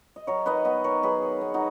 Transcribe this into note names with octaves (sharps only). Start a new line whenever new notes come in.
D#5
F#3 A#4 C#5
D#3 B4 D#5
B3 B4 D#5
D#3 A#4 C#5
F#3 G#4 B4
D#3
B3
D#4 F#4